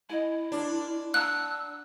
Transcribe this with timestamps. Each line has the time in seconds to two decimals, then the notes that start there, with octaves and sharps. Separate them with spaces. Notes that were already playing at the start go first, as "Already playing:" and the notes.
0.10 E4 D#5 G#5
0.52 D4 F4 A#4 C#5
1.14 F#5 A5 A#5 E6 F#6